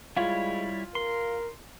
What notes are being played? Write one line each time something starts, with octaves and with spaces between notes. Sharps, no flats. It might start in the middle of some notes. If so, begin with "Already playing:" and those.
G3 G#3 E4 F4 C#5
A#4 C6